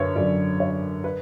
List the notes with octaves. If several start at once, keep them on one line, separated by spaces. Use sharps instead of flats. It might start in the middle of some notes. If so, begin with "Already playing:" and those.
Already playing: F#2 D3 B4 C#5
F#2 D3 F#3 D5
C#5
B4